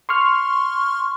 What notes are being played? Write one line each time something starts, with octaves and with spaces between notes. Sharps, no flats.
C6 C#6 F6